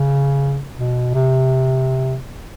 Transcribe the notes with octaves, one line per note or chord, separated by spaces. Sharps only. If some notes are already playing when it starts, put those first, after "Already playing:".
Already playing: C#3
B2
C3